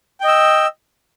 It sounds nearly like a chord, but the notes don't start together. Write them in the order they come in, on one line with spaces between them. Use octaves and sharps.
G5 D#5 E6